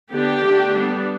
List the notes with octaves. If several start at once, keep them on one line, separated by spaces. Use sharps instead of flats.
D3 B3 D4 G4
D3 A3 D4
G3 B3 D4